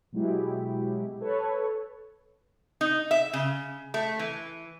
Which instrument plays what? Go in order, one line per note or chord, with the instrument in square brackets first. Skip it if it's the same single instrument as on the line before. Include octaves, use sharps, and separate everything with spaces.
[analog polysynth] B2 F#3 G#3 E4 G4
A4 B4 C#5
[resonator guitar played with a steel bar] D#4
E5
C#3
A3
E3